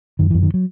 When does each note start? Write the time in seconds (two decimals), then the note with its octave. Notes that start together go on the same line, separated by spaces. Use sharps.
0.19 F#2 D#3
0.31 F#2 E3
0.43 D#3
0.54 F#3